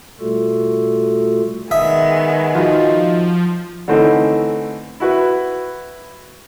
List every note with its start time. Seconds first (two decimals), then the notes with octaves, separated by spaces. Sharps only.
0.20 B2 G3 A3 F4 F#4 A4
1.71 D#3 G#3 B3 E5 D#6
2.55 F3 D#4 F4 F#4
3.88 D3 E3 A3 C4 C#4 D#4
5.00 E4 F#4 B4